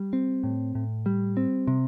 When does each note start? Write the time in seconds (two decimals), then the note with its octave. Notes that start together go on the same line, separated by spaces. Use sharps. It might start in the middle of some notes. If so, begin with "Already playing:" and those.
Already playing: G3
0.13 C4
0.44 A2
0.75 A2
1.06 G3
1.37 C4
1.67 C3